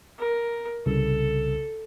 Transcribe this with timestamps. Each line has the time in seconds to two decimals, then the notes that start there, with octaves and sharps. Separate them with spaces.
0.19 A#4
0.86 C2 C#3 A4